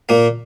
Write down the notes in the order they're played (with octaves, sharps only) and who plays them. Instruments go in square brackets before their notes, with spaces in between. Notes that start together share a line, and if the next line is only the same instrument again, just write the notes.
[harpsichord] A#2 A#3